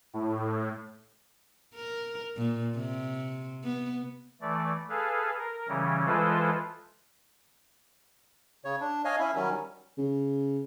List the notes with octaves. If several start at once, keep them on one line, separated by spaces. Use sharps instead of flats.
A2
A#4
A#2
C3
B3
E3 A3 D5
G#4 A4 B4 F5
A#4
C#3 E3 G3 C#4
E3 G#3 F4 A4 B4 C5
C#3 C#5
D4
C#5 D#5 F5 G#5
C#4 E4 E5
D#3 F#3 G3 C#4
C#3